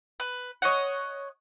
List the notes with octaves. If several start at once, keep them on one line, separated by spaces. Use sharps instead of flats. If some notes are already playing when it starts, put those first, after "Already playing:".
B4
C#5 D#5 F#5